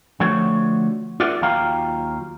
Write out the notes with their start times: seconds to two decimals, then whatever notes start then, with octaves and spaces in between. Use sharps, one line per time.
0.20 D3 F3 A3 F#4 C#5
1.20 F4 G#4 A#4 D5 E5 F#5
1.41 D#2 F#3 F4 G4 F5 A#5